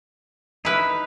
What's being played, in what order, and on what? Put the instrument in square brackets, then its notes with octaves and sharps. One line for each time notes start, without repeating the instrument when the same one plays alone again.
[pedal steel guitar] D#4 B5 F6 [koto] E4 B4